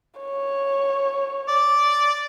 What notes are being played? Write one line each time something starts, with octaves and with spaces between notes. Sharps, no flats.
C#5
D5